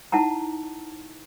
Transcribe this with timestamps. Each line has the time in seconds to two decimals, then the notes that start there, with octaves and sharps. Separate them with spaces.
0.12 D#4 E4 F#5 A5 A#5